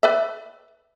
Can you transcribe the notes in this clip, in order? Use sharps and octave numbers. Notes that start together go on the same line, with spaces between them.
B4 D5 E5